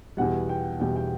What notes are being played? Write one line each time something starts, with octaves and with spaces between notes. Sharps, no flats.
E2 B2 G3 F#5
G5
E2 B2 G3 G5
G5